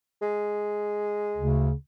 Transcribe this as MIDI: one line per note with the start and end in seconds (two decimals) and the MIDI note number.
0.22 1.73 56
1.38 1.72 38
1.38 1.72 49